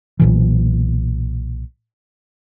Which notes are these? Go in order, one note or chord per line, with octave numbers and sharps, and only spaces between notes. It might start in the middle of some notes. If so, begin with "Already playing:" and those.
B1 A#2 E3